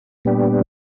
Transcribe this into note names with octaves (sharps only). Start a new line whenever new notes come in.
A#2 G3 B3 D4 G4